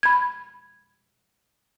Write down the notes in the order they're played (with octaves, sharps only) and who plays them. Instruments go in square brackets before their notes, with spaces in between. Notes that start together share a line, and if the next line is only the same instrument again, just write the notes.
[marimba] B5 G#6